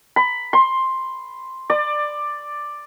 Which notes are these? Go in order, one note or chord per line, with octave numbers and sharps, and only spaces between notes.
B5
C6
D5